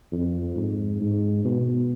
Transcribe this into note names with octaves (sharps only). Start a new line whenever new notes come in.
F2
G#2
G#2
B2